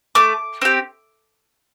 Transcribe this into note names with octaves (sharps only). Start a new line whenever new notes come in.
A3 D6
C4 G4